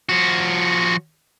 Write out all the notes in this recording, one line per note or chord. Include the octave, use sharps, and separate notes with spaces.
F3 F#4